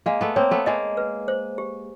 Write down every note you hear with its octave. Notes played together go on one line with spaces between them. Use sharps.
G#3 A#3 F5
A3 B3
A#3 C4 C#5
A3 B3
G#3 A#3 D#5
B4
C5
G4